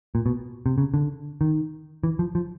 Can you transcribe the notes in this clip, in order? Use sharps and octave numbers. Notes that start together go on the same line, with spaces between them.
A#2
B2
C3
C#3
D3
D#3
E3
F3
F3